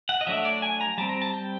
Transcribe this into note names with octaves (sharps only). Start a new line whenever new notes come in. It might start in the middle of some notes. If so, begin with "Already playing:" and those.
F#5
D#5
F#3 A3 D4 E5
D5
G#5
A#5
G3 C4 A5
A#5
A5
G5